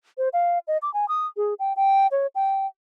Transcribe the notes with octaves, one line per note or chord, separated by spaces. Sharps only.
C5
F5
D#5
D6
G#5
D#6
G#4
G5
G5
C#5
G5